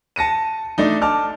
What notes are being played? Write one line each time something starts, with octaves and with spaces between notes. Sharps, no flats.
A5 A#6 C#7 D#7
A3 D4 D#4
A5 D6 F6